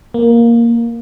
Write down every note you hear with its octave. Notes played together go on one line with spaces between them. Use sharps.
A#3